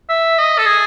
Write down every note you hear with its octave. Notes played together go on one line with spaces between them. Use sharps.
E5
D#5
A4
G#4